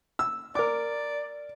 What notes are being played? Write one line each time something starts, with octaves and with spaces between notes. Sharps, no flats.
E6
A#4 D5 D6